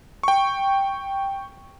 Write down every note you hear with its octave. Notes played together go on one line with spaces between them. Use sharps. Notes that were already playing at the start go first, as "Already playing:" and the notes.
G5 C#6